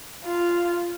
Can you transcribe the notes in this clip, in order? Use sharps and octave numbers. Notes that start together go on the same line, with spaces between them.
F4